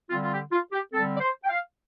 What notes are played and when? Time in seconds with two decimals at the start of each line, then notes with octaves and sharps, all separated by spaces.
0.10 D3 G3 C4 F4
0.22 F4
0.31 G4
0.52 F4
0.72 G4
0.93 D3 G3 C4 A4
1.17 D5
1.21 C5
1.44 G5
1.50 F5